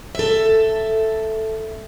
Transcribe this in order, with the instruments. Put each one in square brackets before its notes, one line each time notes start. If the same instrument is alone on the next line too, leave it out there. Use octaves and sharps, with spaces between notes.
[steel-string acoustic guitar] A4 E5